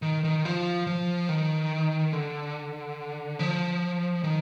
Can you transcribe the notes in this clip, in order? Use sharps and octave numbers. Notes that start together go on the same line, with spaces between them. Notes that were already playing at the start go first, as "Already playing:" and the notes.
D#3
D#3
F3
F3
D#3
D3
F3
D#3